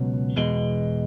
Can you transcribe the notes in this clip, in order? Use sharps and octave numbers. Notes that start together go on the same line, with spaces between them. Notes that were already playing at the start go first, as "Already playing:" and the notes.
Already playing: C#2 B2 F#3
E2 B2 G#3